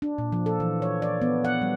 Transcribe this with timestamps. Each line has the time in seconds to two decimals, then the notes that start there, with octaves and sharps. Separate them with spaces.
0.02 D4
0.18 A#2
0.32 F3
0.46 A4
0.60 E3
0.82 C#5
1.02 D5
1.22 B3
1.45 F#5
1.62 G3